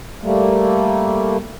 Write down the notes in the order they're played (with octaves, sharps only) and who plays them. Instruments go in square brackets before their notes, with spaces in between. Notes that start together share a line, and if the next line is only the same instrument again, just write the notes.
[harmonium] G3 A3 A#3